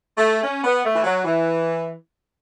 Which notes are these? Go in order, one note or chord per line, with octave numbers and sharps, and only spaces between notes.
A3
C#4
B3
A3
E3
F#3
E3